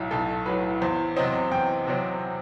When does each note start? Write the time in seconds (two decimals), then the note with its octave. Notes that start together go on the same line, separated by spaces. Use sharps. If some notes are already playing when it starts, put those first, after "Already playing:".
Already playing: B1 A2 F#3 E5
0.11 B1 A4
0.46 A2 F#3 B4
0.82 E2 C5
1.16 C3 F#3 C4 D#5
1.52 E2 G5
1.87 C3 F#3 C4